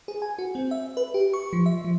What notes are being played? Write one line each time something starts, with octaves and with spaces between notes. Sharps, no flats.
G#4
G#5
F#4
C4
E5
B4
G4
C#6
F3
E5
F3